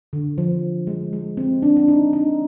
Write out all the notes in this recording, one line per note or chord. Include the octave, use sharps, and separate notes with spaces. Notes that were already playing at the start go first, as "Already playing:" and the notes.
D3
F3
G#3
G#3
C4
D4
D4
D#4
D#4